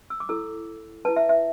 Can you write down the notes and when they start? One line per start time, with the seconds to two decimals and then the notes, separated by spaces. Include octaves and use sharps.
0.10 E6
0.20 D6
0.29 E4 A4 E6
1.05 E4 B4 A5
1.16 E5
1.29 E5